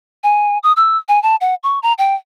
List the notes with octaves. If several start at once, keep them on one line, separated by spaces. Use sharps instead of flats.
G#5
D#6
E6
G#5
A5
F#5
C#6
A#5
G5